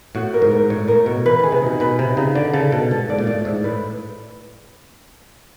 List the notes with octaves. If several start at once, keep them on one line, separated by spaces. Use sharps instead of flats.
A2 F#4
A#4
G#2
A#4
A2 C#5
A2 A#4
B2 C#5
E3 B4
D#3 G#4
C3
B2 D#4
B2 B4
C3 D#4
C#3 D#4
D3 D5
C#3 A4
B2 A4
G#2 A4
G#2 D5
A#2
A2 D5
G#2 E4
A2 B4